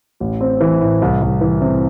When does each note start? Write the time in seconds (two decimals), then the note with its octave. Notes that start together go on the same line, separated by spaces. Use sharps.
0.20 A1
0.41 C4
0.61 E3
0.81 A2
1.02 C2
1.22 C2
1.41 E3
1.62 C3